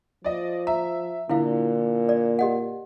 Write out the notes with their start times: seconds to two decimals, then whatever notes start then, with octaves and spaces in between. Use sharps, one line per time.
0.24 F3 D5 D#5
0.67 E5 A#5
1.29 A#2 D3 E4 F5
2.09 D5
2.39 G4 D#5 F#5